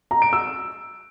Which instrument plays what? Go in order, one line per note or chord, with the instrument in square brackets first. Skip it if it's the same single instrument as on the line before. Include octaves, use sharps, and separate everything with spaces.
[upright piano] A#5
D7
E6